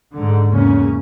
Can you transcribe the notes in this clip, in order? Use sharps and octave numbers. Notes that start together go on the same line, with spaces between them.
G#2 D3
E2 G#2 C#3 A#3 C#4